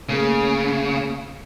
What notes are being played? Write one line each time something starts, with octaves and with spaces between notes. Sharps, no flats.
C#3 A3 A#3 G#4